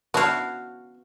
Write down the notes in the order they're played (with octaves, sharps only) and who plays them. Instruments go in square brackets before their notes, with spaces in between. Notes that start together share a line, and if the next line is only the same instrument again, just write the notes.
[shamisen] B3 D4 E4 [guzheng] F#4 F5